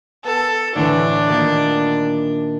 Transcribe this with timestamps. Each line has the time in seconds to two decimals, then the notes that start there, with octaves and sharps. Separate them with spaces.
0.25 B3 A4
0.76 A2 D3 E3 D4
1.28 A#2 D#3 A#4